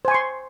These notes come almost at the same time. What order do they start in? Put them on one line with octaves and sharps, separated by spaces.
C5 G#5 C#6 C6